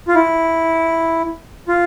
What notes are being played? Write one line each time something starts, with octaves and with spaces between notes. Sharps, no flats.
F4
E4
F4